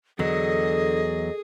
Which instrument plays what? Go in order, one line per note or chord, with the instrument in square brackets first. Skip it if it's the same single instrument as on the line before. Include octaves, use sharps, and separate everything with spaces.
[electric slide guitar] E2 F#3 [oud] D3 [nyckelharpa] G#4 [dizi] D#5